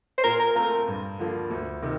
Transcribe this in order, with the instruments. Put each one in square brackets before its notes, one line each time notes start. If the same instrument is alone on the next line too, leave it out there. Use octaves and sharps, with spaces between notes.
[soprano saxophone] C5
[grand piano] A#2 [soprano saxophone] A#4
[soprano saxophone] A#4
[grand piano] A3 C4 F4 [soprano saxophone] A#4
[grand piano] G2
D3 F3 A#3
D2
C3 D#3